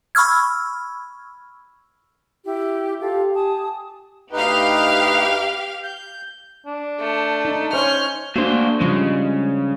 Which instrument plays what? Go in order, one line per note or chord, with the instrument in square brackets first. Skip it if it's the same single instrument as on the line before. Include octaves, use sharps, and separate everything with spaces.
[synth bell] B5 C#6 E6 F6 G#6
[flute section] E4 G4
[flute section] F4 A4 F5 [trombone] G4
[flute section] G#5 A5 D#6
[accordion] D2 D#4 B4 [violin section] G4 F5
[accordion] G6
[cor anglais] D4
[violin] A3
[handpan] D#4
[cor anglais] C#4 [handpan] C5 C#5 [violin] F6 G6
[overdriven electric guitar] A3 C5 [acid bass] A#3 [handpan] D4 F#4
[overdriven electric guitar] C#3 [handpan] F3 G3 [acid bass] G#3